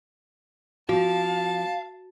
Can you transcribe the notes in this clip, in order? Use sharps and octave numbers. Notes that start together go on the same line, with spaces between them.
F3 C4 F#4 F5 A5